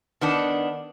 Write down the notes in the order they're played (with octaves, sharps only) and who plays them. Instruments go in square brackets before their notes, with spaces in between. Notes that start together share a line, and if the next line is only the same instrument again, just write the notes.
[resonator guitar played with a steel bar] D#3 B3 D4